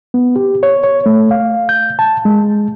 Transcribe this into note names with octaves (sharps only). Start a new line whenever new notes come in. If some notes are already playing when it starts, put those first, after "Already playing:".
B3
G4
C#5
C#5
A3
F5
G6
A5
G#3